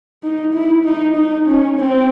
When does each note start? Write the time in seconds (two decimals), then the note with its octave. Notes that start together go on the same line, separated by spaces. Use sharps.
0.23 D#4
0.54 E4
0.85 D#4
1.16 D#4
1.47 C#4
1.78 C4